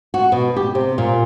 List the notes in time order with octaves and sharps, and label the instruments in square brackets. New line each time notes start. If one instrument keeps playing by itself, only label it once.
[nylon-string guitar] F#4
B2
G4
C3
A#2